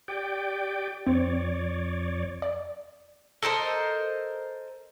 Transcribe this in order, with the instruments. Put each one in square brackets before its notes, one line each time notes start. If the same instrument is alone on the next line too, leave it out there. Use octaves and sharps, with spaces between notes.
[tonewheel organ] G4 D5 G5
[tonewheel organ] F2 C#5 D5 [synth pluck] C4
[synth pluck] D5
[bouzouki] A4 A#4 C5 D#5